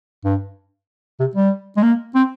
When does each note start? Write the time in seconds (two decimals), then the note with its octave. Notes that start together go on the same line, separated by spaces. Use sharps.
0.25 G2
1.20 C3
1.36 G3
1.77 G#3
1.83 A#3
2.15 C4